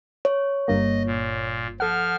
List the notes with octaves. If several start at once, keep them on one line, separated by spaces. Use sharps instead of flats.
C#5
G1 G2 A#3 D#5
A#2
F3 A4 F#5 F6